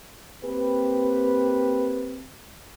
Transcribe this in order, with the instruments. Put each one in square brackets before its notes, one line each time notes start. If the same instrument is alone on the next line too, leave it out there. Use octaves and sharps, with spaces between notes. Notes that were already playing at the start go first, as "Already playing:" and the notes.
[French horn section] A#3 C4 G4 B4